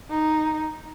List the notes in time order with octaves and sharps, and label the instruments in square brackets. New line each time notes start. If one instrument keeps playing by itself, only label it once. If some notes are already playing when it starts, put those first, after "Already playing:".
[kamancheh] D#4